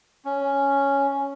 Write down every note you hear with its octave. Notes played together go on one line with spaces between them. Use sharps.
C#4